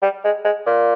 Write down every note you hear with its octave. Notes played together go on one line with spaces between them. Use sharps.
G3
G#3
G#3
A#2